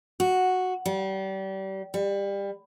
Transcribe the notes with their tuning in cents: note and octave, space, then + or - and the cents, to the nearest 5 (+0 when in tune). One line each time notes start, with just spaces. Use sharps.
F#4 -5
G3 -30
G3 +25